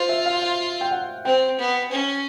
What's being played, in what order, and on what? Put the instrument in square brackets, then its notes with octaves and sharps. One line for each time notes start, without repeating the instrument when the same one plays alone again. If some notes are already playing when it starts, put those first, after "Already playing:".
Already playing: [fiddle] F4 [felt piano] C5
[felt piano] E5
F5
F5
G5
F#5
[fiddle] C4 [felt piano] G5
[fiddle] B3
C#4